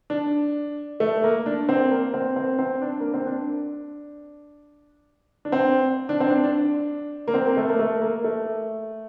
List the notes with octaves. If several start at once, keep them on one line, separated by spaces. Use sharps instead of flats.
D4
A3
A#3
D4
C4
A#3
C4
C4
C4
D4
A#3
C4
D4
D4
C4
D4
C4
D4
D4
A#3
C4
A#3
A3
A#3
A3
A#3
A3